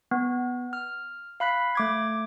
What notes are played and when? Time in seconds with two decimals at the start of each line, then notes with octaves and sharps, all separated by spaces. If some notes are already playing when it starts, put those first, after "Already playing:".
0.11 B3
0.73 F6
1.40 F5 B5 F#6 B6
1.75 A3 D6 G#6